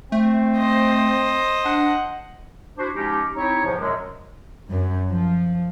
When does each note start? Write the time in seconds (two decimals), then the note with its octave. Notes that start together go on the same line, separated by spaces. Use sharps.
0.12 A3 C4
0.57 C5 D#5
1.65 D4 F#5
2.77 D4 E4 F#4 C5
2.94 F3 G#3 C#4 D#4 G4
3.36 C4 D#4 E4 G4 C#5
3.65 E2 A2 C3 E3 F3
3.79 F#2 B2 F#3 G#3
4.68 F#2
5.09 F3